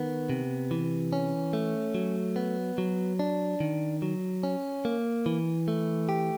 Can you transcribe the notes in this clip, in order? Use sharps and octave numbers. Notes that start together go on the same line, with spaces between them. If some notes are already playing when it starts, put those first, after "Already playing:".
Already playing: D#3 B3
C3
E3
C#4
A3
F#3
B3
F#3
D4
D#3
F#3
C#4
A#3
E3
A3
G4